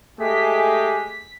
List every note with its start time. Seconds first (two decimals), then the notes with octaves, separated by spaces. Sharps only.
0.20 G#3 A3 G4 G#4 B6